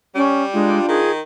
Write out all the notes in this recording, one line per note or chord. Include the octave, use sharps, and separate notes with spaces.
G3 C#4
G#3 D4 F4
D#3 G#4